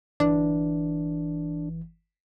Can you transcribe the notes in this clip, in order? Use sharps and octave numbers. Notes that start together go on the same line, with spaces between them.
G1 E3 D4